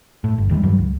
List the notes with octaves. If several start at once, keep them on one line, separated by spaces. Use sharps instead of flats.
A2
G1
E2 D#3 G3 G#3
G2 D#3 F#3 G3
C#2